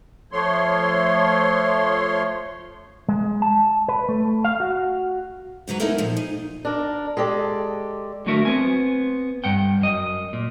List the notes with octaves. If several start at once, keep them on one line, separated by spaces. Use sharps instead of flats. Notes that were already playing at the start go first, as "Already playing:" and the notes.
F3 A3 C#5 C6
G#3
A5
B4
A3
F5
F#4
G#2 C#3 F#3 B4 A#5
A#3 B3 D#4 E4 A4 A#4
A#2 F3
D#4
D4 A#4
G#3 G4 A4 D5
D3 F#3 A3 F#4 A#4 E5
B3 C4 G#5
G2 F#5 G5
F#2 D#5
A#2